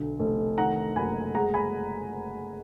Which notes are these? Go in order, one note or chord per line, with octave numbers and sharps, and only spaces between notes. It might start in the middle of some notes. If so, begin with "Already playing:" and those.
Already playing: B1 D3
F1
D#3 F#5 A#5
F#1 G#5 B5
G#3 F#5 A#5
G#5 B5